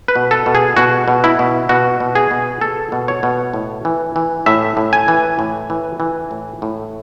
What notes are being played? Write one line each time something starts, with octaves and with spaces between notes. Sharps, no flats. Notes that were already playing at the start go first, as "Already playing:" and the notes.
B4
B2
A4
B2
G#4
B2 F#4
B2
E4
B2
B2 F#4
B2
G#4
B2
B2 A4
B2
C#5
B2
A2
E3
E3
A2 E5
A2
G#5
E3
A2
E3
E3
A2
A2